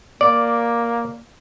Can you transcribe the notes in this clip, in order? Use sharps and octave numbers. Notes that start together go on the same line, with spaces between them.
A#3 D5